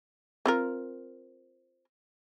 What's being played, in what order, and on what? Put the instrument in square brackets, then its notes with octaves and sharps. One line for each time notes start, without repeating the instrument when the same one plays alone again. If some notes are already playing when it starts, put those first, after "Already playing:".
[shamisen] C4 F4 A#4